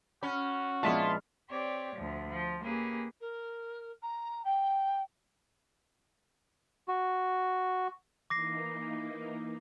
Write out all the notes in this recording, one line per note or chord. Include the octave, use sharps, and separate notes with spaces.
C#4 F#4 B5
A#1 G#3 B3 E4 F4 D5 A5
C4 G4 C#5 D5
D2 F3
F3
A#3 C#4 G4 G#4 B4
A#4
A#5
G5
F#4
E3 A#3 D#4 D6 A#6 C7